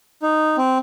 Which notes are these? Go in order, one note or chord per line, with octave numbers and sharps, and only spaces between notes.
D#4
C4